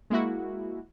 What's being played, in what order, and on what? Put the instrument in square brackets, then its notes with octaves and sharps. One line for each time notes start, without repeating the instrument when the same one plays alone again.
[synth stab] G#3 A#3 E4 F#4